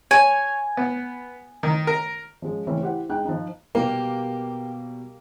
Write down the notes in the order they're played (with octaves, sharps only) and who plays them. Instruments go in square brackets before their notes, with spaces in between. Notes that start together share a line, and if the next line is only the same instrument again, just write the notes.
[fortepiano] C#5 [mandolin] G#5
[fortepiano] B3
D#3
A#4
[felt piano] F3 G#3 C#4
C#3 E3 A3 C4 C#4
E4 G4 C5 F#5
G#3 D#4 G5 F#6
F3 D#4
[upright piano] B2 G3 [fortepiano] A#3 [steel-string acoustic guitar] G4